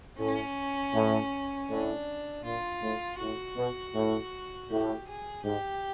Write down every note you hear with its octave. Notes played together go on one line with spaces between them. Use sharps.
A2 C#4
A2
A2 D4
A#2 F4
A2
A2 F#4
B2
A2
A2 G4
G#4
G#2 G4